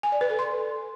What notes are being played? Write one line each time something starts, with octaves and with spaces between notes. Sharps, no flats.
G#5
D5
B4
A4
C6